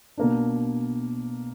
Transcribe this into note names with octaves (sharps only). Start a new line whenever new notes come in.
B2 A#3 D4